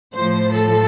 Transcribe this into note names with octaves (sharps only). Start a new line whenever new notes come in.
A2 F3 C5
A4